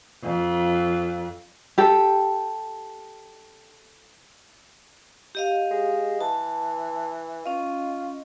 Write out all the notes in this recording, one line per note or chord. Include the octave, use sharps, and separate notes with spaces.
F2
G4 A4
G4 D#5 F5
G#3
E3 A5
C#4 F4 D#5